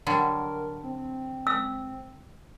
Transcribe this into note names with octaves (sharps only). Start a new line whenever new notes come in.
D3 F#3 G3 A#4
C4
E6